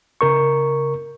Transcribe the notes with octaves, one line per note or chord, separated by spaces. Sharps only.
C#3 A#4 C#6